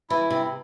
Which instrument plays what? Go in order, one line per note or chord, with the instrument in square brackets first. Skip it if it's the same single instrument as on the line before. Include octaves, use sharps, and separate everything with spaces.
[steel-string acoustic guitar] E3 [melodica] E4
[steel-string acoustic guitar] C3